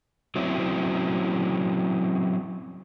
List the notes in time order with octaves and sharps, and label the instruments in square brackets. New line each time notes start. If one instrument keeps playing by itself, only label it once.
[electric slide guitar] F#3 C4 C#4 E4